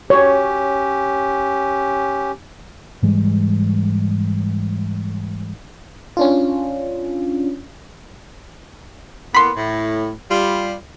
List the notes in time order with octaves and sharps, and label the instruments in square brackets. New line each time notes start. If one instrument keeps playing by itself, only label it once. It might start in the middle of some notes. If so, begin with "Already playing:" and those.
[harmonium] C#4 G4 [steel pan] C#5
[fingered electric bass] G#2 E3 G3 G#3
[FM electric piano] C#4 D4 F4
[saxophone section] A2 A#3 B3 [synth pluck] B5 C6
[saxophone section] A2
G3 F4